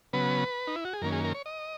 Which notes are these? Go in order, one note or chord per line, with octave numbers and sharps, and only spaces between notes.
C#3 F#3 B3 B4
D#4
E4
F#4
G#4
F#2 D#3 A#3 C#4 A#4
G#4
A#4
C#5
D#5